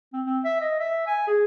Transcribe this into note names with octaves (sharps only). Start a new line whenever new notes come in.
C4
C4
E5
D#5
E5
G#5
G#4